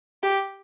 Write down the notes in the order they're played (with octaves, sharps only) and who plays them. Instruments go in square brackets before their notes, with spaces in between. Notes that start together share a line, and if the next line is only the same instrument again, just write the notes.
[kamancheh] G4